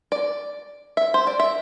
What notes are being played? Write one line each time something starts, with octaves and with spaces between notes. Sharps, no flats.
D5
E5
C5
D5
E5